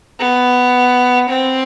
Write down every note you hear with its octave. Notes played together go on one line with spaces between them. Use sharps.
B3
C4